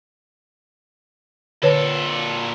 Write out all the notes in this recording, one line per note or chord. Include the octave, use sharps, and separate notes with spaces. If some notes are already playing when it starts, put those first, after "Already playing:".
A#2 D3 A4 B4 C#5